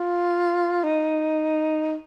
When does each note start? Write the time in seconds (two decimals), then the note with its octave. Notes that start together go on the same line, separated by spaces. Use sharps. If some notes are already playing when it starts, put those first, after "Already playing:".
Already playing: F4
0.83 D#4